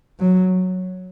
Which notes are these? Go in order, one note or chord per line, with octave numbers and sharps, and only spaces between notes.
F#3